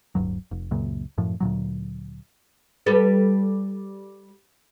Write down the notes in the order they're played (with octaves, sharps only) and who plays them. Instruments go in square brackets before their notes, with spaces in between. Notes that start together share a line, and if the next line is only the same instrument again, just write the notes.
[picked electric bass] D1 G2 F#3
F1
C#2 F#2 A#2
F#2 A2 F3
D2 A#2 F#3
[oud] G3 A4 B4